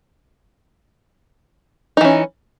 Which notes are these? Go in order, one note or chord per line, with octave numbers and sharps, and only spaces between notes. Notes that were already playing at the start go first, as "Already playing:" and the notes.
E3 C#4 D#4